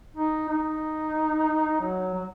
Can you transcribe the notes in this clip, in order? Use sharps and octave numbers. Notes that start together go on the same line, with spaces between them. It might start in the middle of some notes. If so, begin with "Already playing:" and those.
D#4
D#4
F#3
F#3